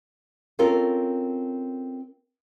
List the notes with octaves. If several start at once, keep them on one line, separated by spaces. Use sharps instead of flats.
C4 C#4 F4 A4 A#4